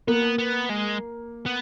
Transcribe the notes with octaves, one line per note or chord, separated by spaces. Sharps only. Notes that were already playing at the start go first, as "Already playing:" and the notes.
A#3 B3
B3
G#3
B3